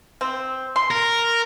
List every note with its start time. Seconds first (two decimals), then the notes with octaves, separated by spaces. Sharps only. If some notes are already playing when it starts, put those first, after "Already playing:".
0.21 C4
0.76 C6
0.91 A#4